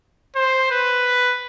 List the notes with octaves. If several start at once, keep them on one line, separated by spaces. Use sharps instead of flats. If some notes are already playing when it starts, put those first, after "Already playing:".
C5
B4